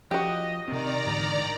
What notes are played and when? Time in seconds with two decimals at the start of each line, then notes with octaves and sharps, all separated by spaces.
0.11 F3 F#4 G4 D#5
0.68 C3 D#3 C4 D5 A#5
1.07 G#2 D3 E3